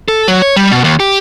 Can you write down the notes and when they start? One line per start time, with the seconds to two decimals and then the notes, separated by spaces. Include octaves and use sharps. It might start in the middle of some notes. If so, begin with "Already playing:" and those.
0.08 A4
0.28 F#3
0.42 C#5
0.56 G3
0.72 B2
0.84 D#2
1.00 G4